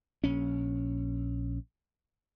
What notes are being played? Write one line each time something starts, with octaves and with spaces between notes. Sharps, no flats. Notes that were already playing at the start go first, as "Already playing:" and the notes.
A#1 C#4